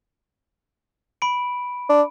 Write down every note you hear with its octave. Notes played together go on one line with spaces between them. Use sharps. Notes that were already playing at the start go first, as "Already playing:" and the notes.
B5 D7
D4